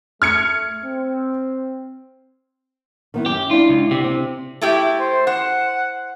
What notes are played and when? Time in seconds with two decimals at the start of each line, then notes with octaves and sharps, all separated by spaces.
0.22 A3 F6 G#6 C#7
0.84 C4
3.14 D#3 B3 E4
3.26 F#2 G4
3.51 D4 E4 F4
3.69 C#2
3.91 C3 G4
4.04 C4
4.62 A3 E4 G4
5.00 C5
5.27 C5 F#5